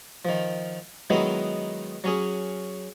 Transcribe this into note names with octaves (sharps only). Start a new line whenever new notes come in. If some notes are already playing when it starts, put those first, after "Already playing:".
D#3 F3
D#3 F#3 G#3 B3 D#4 E4
F#3 C#4 G#4